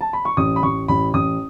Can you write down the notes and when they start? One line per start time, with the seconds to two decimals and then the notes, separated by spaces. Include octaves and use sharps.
0.01 A5
0.13 B5
0.25 C#6
0.37 A1 D#6
0.56 B5
0.63 A1 C#6
0.88 A1 B5
1.14 A1 D#6